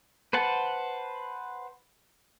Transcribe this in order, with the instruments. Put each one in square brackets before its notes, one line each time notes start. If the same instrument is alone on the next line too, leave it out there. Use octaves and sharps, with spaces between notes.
[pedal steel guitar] B4 C5 F#5 A5